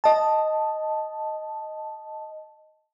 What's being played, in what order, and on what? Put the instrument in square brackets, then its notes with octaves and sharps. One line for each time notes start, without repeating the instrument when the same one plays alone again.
[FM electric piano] D#5 A5